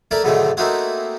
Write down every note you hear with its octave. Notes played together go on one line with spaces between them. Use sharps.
A3 E4 A#4 D5
G#2 B2 D3 D#3 F#3 A3
A3 A#3 C4 D#4 E4 F#4